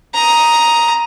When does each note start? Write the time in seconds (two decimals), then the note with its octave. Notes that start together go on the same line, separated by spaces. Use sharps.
0.14 A#5 D#6